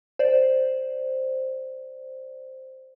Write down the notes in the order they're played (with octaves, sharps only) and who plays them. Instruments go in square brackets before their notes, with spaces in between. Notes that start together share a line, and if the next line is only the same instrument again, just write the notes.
[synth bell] C5 D5